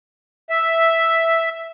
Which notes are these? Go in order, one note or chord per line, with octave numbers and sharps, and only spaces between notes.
E5